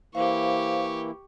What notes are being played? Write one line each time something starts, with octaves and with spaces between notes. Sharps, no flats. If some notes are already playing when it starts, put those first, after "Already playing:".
E3 A#3 E4 G4 C5 F5 C#6